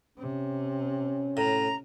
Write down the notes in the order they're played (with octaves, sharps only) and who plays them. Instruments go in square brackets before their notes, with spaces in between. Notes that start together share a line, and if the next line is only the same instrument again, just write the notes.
[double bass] C3 [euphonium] C#4
[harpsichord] A2 [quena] A#5